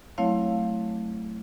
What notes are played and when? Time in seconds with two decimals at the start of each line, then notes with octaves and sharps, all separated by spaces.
0.18 F#3 A3 C4 E4 C#5 F5